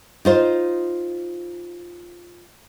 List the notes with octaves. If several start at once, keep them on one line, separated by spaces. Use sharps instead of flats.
D#4 F4 C5